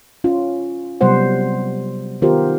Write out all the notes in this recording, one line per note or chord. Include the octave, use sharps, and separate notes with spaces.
C#4 F4
C3 F#3 G3 B3 C5 F#5
D#3 B3 F4 G4 A#4 C5